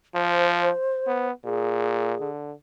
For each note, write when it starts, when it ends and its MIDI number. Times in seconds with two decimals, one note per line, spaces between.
0.15 0.70 53
0.15 1.27 72
1.07 1.31 59
1.45 2.14 46
1.45 2.29 68
2.20 2.53 50